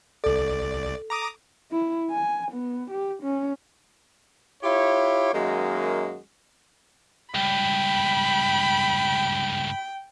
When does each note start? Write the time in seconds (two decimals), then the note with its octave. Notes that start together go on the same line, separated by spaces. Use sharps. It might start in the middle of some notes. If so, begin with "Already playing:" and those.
0.24 C2 A4 D5
1.10 A#5 D6 D#6
1.71 E4
2.11 G#5
2.52 B3
2.91 G4
3.23 C#4
4.63 E4 F4 G4 C#5
5.34 F#2 D#3 G#3 A#3 F#4
7.35 C#2 G2 G5 B5